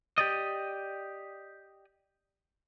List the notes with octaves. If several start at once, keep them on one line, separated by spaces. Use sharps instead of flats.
G4 D5 D#5